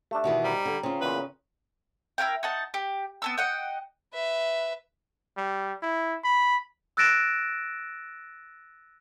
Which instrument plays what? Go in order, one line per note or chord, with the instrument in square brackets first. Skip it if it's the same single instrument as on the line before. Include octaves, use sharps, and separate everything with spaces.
[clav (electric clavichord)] A3 D4 [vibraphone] G4 E5
[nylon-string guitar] B2 D#3 E3
[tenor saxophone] G3 [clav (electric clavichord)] D#4 C5 D#5 [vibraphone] G5 A#5
[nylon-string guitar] D3
[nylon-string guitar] C#3 F4 [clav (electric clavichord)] C4
[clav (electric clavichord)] E2 A#2 [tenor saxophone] B4
[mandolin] E4 A#4 F5 G5
D#4 F#5 A5
G4
B3 A5 E6
D#5 F#5 G5
[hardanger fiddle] B4 E5
[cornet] G3
E4
B5
[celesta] E6 F#6 A6 A#6 D7 E7